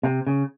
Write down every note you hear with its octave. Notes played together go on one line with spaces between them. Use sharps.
C3
C#3